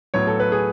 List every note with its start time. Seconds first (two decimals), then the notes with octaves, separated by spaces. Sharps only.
0.14 A2 F#3 B3 C#5
0.27 A4
0.40 B4
0.52 G#4